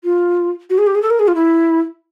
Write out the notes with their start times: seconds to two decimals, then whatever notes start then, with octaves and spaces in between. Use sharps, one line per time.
0.04 F4
0.70 F#4
0.78 G#4
0.87 G4
0.95 G#4
1.02 A4
1.10 A#4
1.19 G#4
1.27 F4
1.35 E4